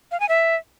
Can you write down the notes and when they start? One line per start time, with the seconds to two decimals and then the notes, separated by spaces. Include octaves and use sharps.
0.12 F5
0.20 G#5
0.29 E5